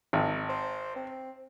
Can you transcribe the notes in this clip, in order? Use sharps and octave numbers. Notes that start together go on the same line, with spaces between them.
G#1
C5
C4